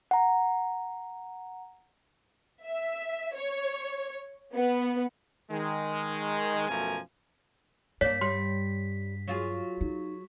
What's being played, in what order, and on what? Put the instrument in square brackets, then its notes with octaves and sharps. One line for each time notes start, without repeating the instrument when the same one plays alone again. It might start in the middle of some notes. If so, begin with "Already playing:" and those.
[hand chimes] F#5 A#5
[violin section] E5
C#5
B3
[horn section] D#3 G#3
F#2 B2 F3 A3 A#4 G#5
[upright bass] G2 [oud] A#3 D4 [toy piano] C#5 [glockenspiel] B6
[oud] G3 [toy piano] C6
[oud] F#3 F4 G#4
[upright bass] D#4